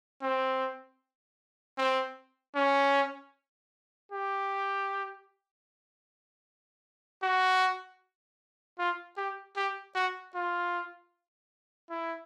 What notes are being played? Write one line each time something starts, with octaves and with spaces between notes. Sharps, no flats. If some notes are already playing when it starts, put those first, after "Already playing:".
C4
C4
C#4
G4
F#4
F4
G4
G4
F#4
F4
E4